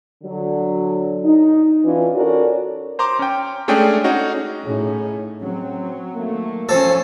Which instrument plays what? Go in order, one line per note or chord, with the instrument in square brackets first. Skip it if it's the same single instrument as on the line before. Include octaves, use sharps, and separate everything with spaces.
[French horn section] D3 F#3
D#4
E3 C#4 D4 F4
C#4 F#4 A4 A#4 C#5 D5
[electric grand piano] C5 A#5 C6 D6
C#4 G5
G#3 A3 C#4 D4 G#4 G5
C#4 D#4 F#4
[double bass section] A2 [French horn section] C#4 D#4 G#4
[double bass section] F#3 [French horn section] C4 C#4
[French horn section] D#3 A3 A#3
[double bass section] F3 C#4 [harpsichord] C4 A4